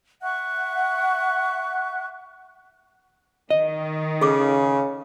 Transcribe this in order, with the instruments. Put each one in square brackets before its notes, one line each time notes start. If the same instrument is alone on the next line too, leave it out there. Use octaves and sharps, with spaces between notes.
[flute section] E5 F#5 C#6 F#6
[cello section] D#3 [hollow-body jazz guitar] D#5
[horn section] C#3 [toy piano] G#4 A4 D6